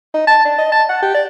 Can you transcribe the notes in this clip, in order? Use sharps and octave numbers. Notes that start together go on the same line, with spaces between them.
D#4
A5
D4
D#5
A5
F#5
G4
D5